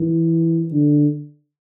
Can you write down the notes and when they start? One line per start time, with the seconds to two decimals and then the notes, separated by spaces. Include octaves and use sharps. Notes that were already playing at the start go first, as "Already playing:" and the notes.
Already playing: E3
0.71 D3